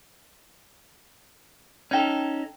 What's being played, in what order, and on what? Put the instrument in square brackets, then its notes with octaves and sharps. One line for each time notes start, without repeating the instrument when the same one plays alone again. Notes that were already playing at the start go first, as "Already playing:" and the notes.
[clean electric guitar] C#4 D#4 A4 [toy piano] C#5 G5